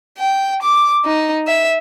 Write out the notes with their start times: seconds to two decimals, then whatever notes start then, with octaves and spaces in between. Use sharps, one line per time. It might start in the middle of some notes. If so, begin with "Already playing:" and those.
0.18 G5
0.62 D6
1.05 D#4
1.47 E5